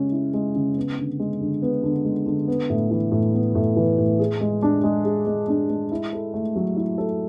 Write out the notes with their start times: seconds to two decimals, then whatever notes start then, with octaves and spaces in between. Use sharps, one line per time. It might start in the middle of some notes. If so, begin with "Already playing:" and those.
Already playing: C#3 G#3 C#4
0.12 E4
0.34 G#3
0.56 C#3
0.77 B3
0.98 D3
1.20 G#3
1.41 D3
1.62 B3
1.84 D3
2.05 G#3
2.26 D3
2.48 B3
2.70 A2
2.91 E3
3.12 A2
3.33 B3
3.55 A2
3.76 E3
3.98 A2
4.19 G#4
4.41 G#3
4.63 D4
4.84 G#3
5.05 G#4
5.27 G#3
5.48 D4
5.70 G#3
5.92 E4
6.13 A4
6.34 A3
6.56 F#3
6.77 E4
6.98 A4